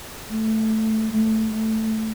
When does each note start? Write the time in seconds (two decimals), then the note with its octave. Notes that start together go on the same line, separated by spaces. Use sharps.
0.27 A3
1.11 A3
1.52 A3